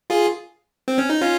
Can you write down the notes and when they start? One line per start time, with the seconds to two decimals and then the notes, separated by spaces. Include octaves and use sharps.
0.10 F4 G#4
0.88 C4
0.98 C#4
1.10 D#4
1.21 C#4 F4